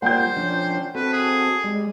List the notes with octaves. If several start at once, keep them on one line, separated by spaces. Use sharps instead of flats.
G3 A#3 C5 F#5 G5 G6
F3 C#4 D4
C4 F#4 A4 B4
G#4
G3 G#3